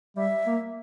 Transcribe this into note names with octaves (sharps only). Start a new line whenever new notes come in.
G3 E5
A#3